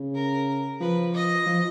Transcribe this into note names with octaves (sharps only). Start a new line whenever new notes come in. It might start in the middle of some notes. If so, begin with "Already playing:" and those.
Already playing: C#3
A#4
F3 B4
D#5
F3